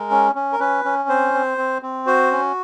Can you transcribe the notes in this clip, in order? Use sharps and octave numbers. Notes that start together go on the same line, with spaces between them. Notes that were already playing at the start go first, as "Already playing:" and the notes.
Already playing: G#3 A#4
C#4
C#4
A#4
C#4 B4
C#4
C4 C5
C4
C4
C4
F#4 C5
C#4